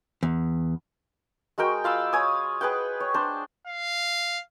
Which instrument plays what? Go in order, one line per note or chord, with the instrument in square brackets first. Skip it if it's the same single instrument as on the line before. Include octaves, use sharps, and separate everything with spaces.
[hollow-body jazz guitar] E2
[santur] G#3 F#4 A#4 G5
F4 F5 B5 E6
C#5 G#5 D#6
G#4 B4 F#5 G5
C#5
D4 C5
[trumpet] F5